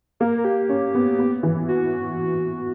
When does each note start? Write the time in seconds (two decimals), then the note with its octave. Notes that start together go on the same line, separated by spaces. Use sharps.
0.20 A#3 A#4
0.38 A#4
0.45 G4
0.69 C#4
0.95 B3
1.19 B3
1.43 E3
1.68 F#4